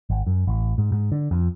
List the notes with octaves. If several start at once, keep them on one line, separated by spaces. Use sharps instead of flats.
G#1
F#2
A1
G#2
G#2
D3
F2